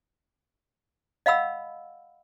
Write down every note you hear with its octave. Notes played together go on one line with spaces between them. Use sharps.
D#5 F5 F#5 B5 E6